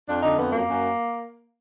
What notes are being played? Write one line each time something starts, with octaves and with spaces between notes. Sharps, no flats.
F2 D4
D3 D#4
F2 B3
F#2 A#3
F#2